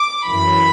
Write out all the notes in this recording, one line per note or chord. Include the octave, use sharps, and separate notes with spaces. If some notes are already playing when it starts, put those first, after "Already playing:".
Already playing: D6
F#2 E3 B5